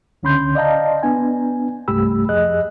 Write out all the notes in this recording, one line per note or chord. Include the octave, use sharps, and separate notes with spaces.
C#2 D3 C#4 B5 C6 G6
D5 D#5 F5 A5 A#5
B3 D4 G#5
C2 G2 A3 G4 B5 E6
F2 G#4 D#5 F#6